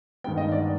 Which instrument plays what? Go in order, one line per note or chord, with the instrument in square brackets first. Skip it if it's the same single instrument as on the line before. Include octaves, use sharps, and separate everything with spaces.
[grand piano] G2 D#3 G#3 B3 G5
D#5
D5